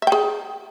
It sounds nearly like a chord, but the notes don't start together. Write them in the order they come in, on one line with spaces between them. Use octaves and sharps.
E5 G5 G#4